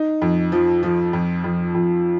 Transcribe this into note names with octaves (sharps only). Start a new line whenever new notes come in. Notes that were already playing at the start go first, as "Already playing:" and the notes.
Already playing: D#4
F2
F3
F3
F2
F2
F2